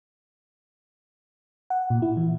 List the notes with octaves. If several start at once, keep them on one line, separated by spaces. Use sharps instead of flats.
F#5
A#2
E4
E3